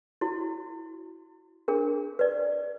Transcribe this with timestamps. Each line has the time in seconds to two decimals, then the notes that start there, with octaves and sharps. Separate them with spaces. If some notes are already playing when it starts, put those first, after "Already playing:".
0.21 E4 F#4
1.68 D4 G#4 A#4
2.19 B4 D5